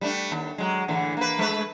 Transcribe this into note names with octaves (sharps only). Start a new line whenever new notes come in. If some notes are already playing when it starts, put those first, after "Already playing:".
G3 A3 D4
D#2
F#3 G#3
A2 D3 E3
A#3 B4
G#3 A3 B4